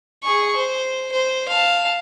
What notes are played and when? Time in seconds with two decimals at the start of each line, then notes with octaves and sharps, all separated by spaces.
0.23 G#4 C#6
0.56 C5
1.12 C5
1.48 F5 A5